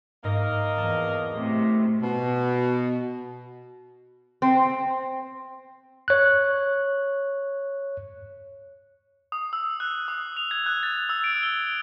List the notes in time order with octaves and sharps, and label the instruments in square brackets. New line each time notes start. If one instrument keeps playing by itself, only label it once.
[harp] G#2 [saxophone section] A#3 A#4 D#5
[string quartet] E2 [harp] A5
[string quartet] A2 C3
[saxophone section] B2
[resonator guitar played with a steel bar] C4
[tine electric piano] C#5 F#6
[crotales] D#6
E6
F#6
D#6
F7
G#6
F#6
A6
E6
D7
G7